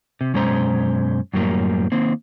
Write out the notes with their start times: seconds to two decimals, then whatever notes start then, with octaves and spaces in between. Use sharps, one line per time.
0.21 C3
0.34 F#2 B2 G#3 C#4 C5 A#5
1.34 F#2 A2 F#3 G3 A#3
1.92 D#3 A#3 C4